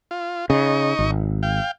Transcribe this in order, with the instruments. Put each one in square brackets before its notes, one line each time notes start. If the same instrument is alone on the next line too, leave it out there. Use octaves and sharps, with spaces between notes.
[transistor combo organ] F4
[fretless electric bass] C#3 [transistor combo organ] D#4 D#5 C#6
[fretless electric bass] G#1
[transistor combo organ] F5 G5